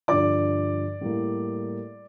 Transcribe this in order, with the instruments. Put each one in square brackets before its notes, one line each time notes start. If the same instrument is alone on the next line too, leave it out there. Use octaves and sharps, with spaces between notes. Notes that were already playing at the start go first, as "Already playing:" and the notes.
[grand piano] G2 D3 F3 D5 D6
A2 G3 A#3